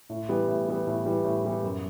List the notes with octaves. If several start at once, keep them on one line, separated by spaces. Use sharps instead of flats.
A2
E3 G3 B3
A2
E3 G3 B3
A2
E3 G3 B3
A2
E3 G3 B3
F#2